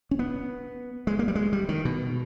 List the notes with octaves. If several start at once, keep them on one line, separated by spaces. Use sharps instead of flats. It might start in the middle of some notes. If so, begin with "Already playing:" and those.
C#4
B3
G#3
A#3
G3
G#3
G3
D#3
B2